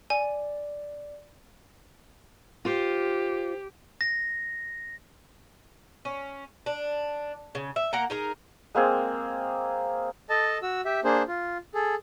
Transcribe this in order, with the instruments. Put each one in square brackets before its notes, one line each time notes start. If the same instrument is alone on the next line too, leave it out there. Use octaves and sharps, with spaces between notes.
[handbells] D5 [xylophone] G#5
[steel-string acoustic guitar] F4 C5 [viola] G4
[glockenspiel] A#6
[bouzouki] C#4
D4
C#3
E5
A#3 A#4 F#5 A#5
D#4 G#4 A#4
[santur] G#3 A#3 C4 G#4
[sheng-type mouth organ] A4 D#5 A5
F#4 E6
G4 E5
A#3 D4 G#4 C5
F4
G#4 A4